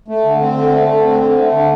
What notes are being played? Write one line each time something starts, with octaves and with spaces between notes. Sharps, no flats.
A3
D3
C4
D3
A3
D3
C4
D3
A3
D3